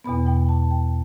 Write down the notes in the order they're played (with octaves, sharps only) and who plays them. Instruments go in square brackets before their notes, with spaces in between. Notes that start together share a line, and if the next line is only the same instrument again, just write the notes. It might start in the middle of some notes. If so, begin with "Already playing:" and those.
[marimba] E2 B2 B3 B5
G5
A5
G5